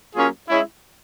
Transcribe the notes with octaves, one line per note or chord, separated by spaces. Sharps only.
F#3 A#3 C#4 F4 G#4
G#3 C#4 E4